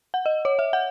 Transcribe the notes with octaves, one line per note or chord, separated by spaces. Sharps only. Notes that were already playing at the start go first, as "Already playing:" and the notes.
F#5
D#5
C#5
E5
F#5